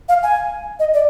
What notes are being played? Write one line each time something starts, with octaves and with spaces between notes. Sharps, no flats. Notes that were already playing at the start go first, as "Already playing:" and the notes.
F5
G#5
D#5
D5